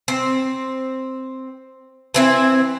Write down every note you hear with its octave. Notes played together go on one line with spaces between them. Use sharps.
C4
E3 C4 E4